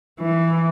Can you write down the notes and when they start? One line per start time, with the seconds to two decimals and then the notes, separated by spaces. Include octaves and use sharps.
0.20 E3